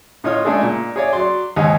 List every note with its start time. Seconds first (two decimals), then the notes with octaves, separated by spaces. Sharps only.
0.24 A2 D#4 F4 C#5 D#6 F6
0.45 G#3 A3 D4 D#4 G#4 A4
0.63 A#2
0.96 G#4 C#5 D5 E5
1.13 F#3 D5 C6
1.56 D#2 G#2 D#4 G#4